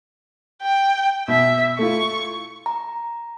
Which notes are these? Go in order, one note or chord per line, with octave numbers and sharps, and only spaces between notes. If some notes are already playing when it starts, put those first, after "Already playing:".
G5
B2 E5
A3 E4 F4 C#6
A#5